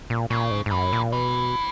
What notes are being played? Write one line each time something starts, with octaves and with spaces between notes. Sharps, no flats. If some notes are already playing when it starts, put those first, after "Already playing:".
A#2
A#2 C#3
G#2
G#2
F#2 E3
A#2
B2 E3